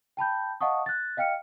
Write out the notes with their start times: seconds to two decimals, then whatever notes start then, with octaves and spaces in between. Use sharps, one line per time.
0.17 G5 A5 B5 G6
0.60 D#5 F5 F#5 A5 C#6 D#6
0.86 F#6 A6
1.17 D#5 F5 G5 F6 C#7